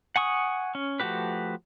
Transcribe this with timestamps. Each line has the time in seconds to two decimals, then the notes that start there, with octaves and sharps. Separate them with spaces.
0.16 F#5 G#5 C#6 D#6
0.75 C#4
1.00 F3 A3 F#4 G4 B4